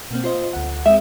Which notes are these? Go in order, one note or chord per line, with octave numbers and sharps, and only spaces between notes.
B2 A#3 C4
F4 C5 D#5
D2 F#5
G#3 C4 E5